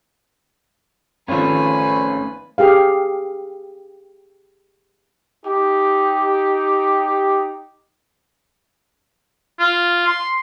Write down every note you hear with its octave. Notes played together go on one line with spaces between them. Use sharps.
G#1 F3 A3 C#4 B4 G#5
G4 G#4 F5
D#4 G4
F4
C6